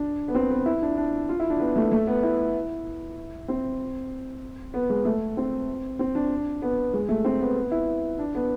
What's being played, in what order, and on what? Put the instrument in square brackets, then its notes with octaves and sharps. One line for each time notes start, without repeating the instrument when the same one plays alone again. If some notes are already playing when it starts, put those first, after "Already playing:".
Already playing: [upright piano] D4
B3
C4
B3
E4
D4
D4
F4
E4
D4
B3
A3
A3
B3
E4
C4
B3
G#3
A3
C4
C4
D4
B3
G#3
A3
C4
B3
B3
E4
D4
B3